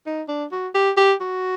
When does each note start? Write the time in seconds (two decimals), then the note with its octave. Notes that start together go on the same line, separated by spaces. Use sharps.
0.06 D#4
0.29 D4
0.52 F#4
0.74 G4
0.97 G4
1.21 F#4